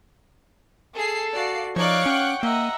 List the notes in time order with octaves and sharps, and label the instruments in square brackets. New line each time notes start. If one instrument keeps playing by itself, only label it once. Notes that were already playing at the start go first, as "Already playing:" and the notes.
[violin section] G#4 C7 [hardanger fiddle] A4
[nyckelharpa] F#4 [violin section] D5 F5 C7
[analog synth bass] F3 [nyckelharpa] D#4 D5 [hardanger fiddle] C#5 F5 [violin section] C#6 D6 F#6
[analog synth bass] C#4 [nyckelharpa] F#5 G5
[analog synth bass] A#3 [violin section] D#5 [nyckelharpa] E5 [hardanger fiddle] F#5 A#5